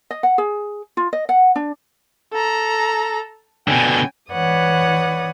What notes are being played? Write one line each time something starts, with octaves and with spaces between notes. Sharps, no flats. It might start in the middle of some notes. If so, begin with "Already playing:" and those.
D#5
F#5
G#4
F4
D#5
F#5
D4
A4 A#5
B2 D3 G5 G#5
E3 B4 C#5 D5 F#5 D#6